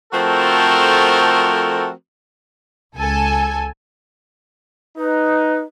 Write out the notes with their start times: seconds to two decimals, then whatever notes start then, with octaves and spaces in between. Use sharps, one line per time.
0.12 F3 A3 C4 F#4 A4 A#4
2.96 C#2 A4 G#5
4.97 D#4 B4